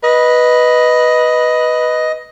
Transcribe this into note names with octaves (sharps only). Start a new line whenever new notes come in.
B4 D#5